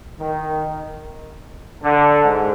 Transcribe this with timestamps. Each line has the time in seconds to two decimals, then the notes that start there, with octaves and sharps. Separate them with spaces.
0.20 D#3
1.84 D3
2.24 G#2